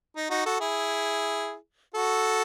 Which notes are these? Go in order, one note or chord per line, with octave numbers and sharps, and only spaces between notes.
D#4
D#4 F#4
F#4 A4
E4 G#4
F#4 A4